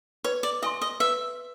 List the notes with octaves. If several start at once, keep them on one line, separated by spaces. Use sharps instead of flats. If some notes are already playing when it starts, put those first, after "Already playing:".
B4 C#5
D5
D#5 E5 G#5 C6
D#5
B4 E5